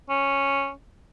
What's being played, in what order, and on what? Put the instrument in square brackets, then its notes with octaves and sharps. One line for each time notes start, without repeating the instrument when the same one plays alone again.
[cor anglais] C#4